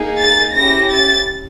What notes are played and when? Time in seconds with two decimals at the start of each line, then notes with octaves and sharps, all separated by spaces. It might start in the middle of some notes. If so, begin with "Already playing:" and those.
Already playing: A#3 D#4 G#4
0.19 A6
0.54 C#4 E4 G4 A#6
0.91 A6